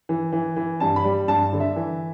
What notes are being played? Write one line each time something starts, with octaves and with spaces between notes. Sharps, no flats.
E3
E3
E3
G2 A5
B5
G3
G2 A5
D3
E5
E3